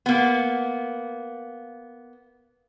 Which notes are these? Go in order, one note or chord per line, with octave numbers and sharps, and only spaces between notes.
A#3 B3